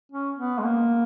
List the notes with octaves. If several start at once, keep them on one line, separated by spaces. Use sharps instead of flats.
C#4
B3
G#3
A#3